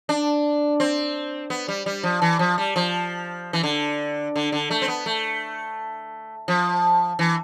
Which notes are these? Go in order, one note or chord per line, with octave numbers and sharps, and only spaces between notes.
D4
C4
B3
G3
G3
F3
E3
F3
G3
F3
E3
D3
D3
D3
A3
C4
B3
A3
F3
E3